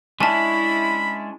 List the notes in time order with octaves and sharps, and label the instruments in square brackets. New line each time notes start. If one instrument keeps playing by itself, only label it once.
[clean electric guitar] G#3 C#4 D4 [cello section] E4 [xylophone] G#5 A5 [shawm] B5